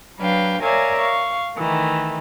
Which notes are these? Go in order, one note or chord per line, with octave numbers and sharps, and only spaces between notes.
F#3 D4 B4 F5 G5
A#4 C#5 D5 E5 F5 G#5
F5 C#6
D#3 E3 A3